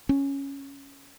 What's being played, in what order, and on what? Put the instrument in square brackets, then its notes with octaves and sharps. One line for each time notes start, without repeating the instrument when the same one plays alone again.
[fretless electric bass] C#4